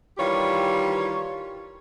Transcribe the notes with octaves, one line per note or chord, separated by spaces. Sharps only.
D#3 E3 G3 F4 G4 C#5